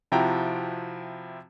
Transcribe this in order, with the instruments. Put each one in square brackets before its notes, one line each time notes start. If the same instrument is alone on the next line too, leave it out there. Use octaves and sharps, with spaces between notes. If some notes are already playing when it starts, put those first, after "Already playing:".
[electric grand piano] C3 F3 E4 F#4 G5 A#5